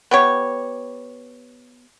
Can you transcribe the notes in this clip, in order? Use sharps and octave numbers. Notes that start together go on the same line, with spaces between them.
B3 G4 C#5